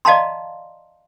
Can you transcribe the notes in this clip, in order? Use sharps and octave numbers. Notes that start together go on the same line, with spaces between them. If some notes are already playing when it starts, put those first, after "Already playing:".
D5 D#5 F5 A5 A#5 C6